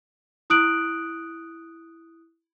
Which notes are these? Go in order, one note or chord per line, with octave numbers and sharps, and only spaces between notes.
E4 D#6 F#6 D7 F#7